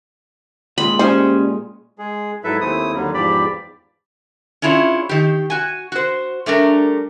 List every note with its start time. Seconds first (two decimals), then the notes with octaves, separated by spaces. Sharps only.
0.78 A#2 G#3 F4 B5
0.99 G3 C#4 C5 D5
1.98 G#3 G#4
2.44 G#2 F#3 E4 A4 B4 E5
2.61 D#2 A3 C4 E4 D#6
2.93 D#2 D3 F#3 G3
3.14 E2 G#2 F3 G4 D5 B5
4.62 C#4 D4 E4 F4 G#4 C#5
5.09 D#3 G4
5.50 F#4 G#5
5.92 F#4 C5
6.46 G3 A3 D4 A#4